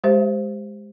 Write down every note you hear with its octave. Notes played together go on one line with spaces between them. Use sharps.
G#3 G4 C5 E5